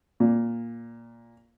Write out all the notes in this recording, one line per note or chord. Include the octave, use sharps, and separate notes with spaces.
A#2